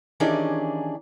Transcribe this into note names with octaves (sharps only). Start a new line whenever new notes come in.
D#3 E3 C#4 D4 G4 G#4